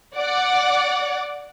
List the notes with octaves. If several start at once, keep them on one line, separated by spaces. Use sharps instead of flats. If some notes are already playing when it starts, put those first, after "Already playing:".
D5 F#5